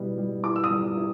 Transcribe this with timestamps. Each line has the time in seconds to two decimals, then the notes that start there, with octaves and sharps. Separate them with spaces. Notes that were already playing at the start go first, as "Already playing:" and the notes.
Already playing: B2 G3 B3 E4
0.18 G3
0.43 E4 D6
0.56 E6
0.64 D#6
0.71 G3
0.97 E4